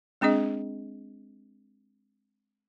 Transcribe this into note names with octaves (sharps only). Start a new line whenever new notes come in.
G#3 C4 D4 G#4 D#5